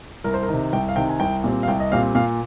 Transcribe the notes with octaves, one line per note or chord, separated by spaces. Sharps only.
C2 A#4
C5
A#4
D#3
C3
C2 G5
F5
C3 D#3 G5
G#5
C2 G5
A#2 G3 C4
F5
C2 G5
D#5
A#2 G3 C4 F5
A#2 F5